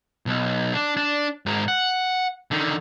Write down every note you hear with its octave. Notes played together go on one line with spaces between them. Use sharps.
B1
D4
D4
G#2 A#4
F#5
D3 D#3